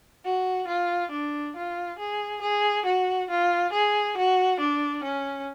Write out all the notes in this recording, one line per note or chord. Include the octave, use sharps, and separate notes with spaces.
F#4
F4
D4
F4
G#4
G#4
F#4
F4
G#4
F#4
D4
C#4